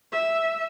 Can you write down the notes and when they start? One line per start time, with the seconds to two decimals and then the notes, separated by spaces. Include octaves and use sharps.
0.12 E5